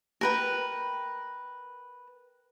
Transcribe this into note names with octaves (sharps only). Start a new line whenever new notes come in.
A#4 B4 G5